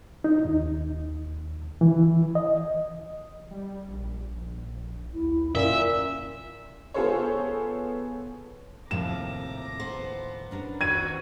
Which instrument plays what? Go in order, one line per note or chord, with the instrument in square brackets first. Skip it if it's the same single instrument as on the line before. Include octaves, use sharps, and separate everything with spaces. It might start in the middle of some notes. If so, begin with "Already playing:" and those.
[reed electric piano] D#4
D#2
E3
D#5
[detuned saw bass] G3
A#1
[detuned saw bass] D#2 [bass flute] E4
[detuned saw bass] F#2 [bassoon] A#2 [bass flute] C#4 [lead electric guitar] E5
[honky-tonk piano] B3 F4 G#4 A4 C5 C#5
[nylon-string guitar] D#2 A2 F3 [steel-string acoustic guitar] C3 [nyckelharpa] A#5 D6 [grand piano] E7
[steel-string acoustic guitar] B3 C5
[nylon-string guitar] C#4 D4 A#4
[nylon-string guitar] D#3 [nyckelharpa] F#4 [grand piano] G#6 D#7